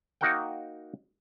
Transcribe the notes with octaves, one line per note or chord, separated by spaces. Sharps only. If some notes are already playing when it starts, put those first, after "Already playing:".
A#3 D#4 F#4 A#4 F#5 G5